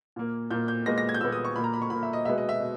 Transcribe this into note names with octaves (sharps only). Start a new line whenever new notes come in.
A#2 A#3
A#2 A#3 G6
G6
A#2 G#3 B3 A#6
A#6
G#6
G6
A#2 G#3 B3 E6
D#6
C#6
A#2 A#3 B5
A#5
B5
C#6
A#2 A#3 B5
E5
D#5
B2 G#3 B3 E5
D#5
E5
B2